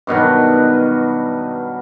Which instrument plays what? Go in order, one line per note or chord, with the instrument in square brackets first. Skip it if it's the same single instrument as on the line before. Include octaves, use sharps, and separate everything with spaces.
[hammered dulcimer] G2 B2 D#3 F#3